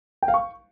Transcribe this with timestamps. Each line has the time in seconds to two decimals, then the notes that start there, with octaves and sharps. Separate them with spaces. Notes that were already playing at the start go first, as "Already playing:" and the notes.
0.23 G5
0.28 F5
0.34 C#6